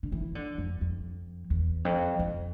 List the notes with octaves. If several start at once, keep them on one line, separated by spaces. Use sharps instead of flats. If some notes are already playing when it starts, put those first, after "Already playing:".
D3
E3
D3
F2
F2
E2
F2
F2